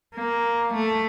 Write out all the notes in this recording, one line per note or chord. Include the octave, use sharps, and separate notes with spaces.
A#3
A3